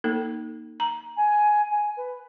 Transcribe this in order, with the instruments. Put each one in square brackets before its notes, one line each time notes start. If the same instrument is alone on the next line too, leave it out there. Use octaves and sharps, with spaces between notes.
[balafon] A#3 D#4 A4
A#5
[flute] G#5
G#5
B4